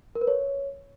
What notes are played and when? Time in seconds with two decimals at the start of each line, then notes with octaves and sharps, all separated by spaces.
0.15 A#4
0.21 B4
0.27 C#5